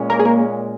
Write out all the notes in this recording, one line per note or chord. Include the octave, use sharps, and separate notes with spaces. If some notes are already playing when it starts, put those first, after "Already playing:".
Already playing: A#2 G#3 C#4
A#3 A#4
G#4
A#3 A#4